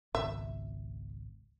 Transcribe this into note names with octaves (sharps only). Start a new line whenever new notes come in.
G#1 C#2 B2 E5